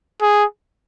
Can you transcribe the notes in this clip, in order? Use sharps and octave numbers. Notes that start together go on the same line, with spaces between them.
G#4